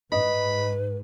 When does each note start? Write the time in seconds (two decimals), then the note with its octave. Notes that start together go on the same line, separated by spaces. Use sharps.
0.12 G#2 B4 D#5 B5